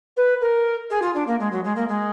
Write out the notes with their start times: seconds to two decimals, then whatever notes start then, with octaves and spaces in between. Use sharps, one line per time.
0.17 B4
0.41 A#4
0.90 G#4
1.02 F4
1.15 D4
1.27 A#3
1.39 G#3
1.51 F#3
1.64 G#3
1.76 A#3
1.88 G#3